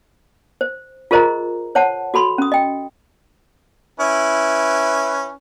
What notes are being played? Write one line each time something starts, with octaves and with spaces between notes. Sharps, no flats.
C5
F4 G#4 A#4 C5 D#5 A#5
C5 C#5 F#5 A5
F#4 A4 B5 C6
C#4 D#6
D#5 G5
C#4 E4 B4